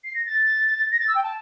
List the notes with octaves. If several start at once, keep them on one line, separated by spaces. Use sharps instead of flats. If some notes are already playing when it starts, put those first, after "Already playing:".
C7
A#6
A6
A#6
A6
E6
G5
A5